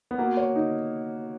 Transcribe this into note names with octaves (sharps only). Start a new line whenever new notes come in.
B3
A#3 F#4
C#5
D#4